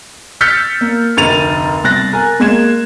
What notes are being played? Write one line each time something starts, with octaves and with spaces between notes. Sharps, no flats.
E6 F6 G6 A6 B6 C#7
A#3
F1 D2 A#4 A6 D#7 F7
C2 B2 F#6 A6 A#6
A#4 G#5
G#3 A#3 G#6 E7